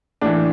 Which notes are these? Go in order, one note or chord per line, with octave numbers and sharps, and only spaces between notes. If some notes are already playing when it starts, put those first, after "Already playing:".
A2 E3 D4